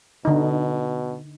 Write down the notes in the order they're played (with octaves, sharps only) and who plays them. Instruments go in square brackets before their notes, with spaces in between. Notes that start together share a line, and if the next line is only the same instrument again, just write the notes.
[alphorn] B2 [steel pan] D3 D#4